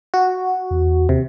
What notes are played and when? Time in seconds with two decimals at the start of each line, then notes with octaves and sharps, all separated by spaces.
0.14 F#4
0.71 E2
1.09 D#2 C3